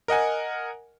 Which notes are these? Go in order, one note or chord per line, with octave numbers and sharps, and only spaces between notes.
A#4 D#5 F#5 G#5